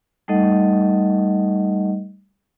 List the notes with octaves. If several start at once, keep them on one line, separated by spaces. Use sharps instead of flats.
G3 A3 D#4 A4 D#5 F#5